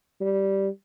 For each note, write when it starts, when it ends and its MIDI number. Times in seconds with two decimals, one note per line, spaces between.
0.21 0.69 55